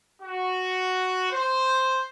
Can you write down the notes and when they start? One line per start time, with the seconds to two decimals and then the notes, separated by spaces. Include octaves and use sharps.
0.22 F#4
1.31 C5